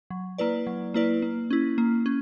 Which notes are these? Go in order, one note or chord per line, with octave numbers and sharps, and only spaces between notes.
F#3
A#3 E4 B4 D5
F#3
A#3 E4 B4 D5
A#3
C#4 E4
A#3
C#4